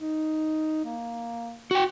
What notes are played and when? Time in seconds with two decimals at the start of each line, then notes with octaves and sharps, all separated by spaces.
0.01 D#4
0.84 A#3
1.71 F#4 G5